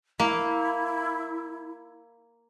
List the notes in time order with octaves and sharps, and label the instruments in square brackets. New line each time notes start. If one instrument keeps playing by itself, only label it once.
[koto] A#3 [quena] E4